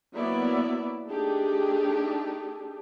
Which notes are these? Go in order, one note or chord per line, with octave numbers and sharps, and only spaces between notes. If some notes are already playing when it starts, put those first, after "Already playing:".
F#3 A#3 B3 E4 D5 E5
A3 D4 D#4 G4 G#4